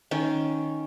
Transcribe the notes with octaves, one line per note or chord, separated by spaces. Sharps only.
D#3 C#4